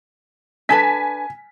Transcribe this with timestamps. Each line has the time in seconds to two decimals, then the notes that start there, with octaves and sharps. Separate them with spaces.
0.69 D4 A4 B4 G#5 B6